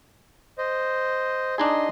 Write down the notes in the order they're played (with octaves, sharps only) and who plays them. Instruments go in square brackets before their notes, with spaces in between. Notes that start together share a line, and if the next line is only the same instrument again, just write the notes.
[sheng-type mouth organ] C5 D#5
[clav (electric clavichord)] D4 D#4 G#4 [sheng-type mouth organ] D#5 C6